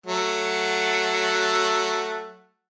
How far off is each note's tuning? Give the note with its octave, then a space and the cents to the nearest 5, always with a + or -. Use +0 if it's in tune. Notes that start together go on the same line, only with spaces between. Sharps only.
F#3 +0 A3 +5 F#5 +0